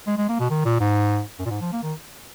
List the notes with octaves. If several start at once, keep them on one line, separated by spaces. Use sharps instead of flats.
G#3
G#3
A#3
B2
D#3
A#2
G#2
F#2
A#2
G#2
F3
A#3
D#3